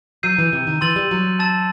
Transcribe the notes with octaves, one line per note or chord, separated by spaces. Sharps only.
F#3 E6 G6 C7 D#7
E3
C3
D#3
E3 C6 E6 A6 D#7 F#7
G3
F#3
A5 E6 A6 E7